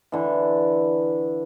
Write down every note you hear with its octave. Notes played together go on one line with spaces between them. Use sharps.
D3 E3